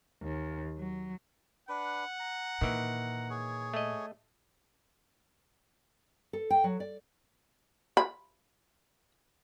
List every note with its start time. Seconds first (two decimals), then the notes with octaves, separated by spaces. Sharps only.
0.22 D#2
0.78 F#3
1.69 D4 B4 F#5
2.20 A#5
2.61 A#2 D#3 E3
3.30 G#4 C#5
3.74 A3 D#5
6.33 A4
6.50 G5
6.64 F#3
6.80 D5
7.97 B5